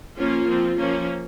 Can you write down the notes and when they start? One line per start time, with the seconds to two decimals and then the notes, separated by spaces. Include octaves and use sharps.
0.17 F3 A#3 C#4 F4
0.47 F3 C4
0.78 F3 A#3 C#4